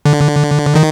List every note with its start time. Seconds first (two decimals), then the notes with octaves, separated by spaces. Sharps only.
0.05 D3
0.75 D#3